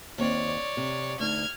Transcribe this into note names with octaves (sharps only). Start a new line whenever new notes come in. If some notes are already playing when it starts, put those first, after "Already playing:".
D#2 C4 C#5 D5
C3
D2 D#4 F6 G#6